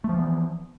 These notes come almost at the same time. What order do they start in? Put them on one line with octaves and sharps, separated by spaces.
A3 F3 E3 B3